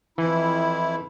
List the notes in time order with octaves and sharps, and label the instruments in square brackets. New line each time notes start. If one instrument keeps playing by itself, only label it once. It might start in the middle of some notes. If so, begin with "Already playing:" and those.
[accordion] F2 E4 [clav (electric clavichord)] E3